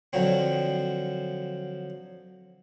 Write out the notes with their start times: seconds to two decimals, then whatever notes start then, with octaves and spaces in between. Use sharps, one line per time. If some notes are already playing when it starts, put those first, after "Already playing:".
0.13 D3 F3 F#3 C4